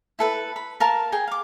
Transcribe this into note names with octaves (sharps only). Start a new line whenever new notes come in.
E4 A4 B4
B5
A#4 F5 A5
G#4 G5
F5 D6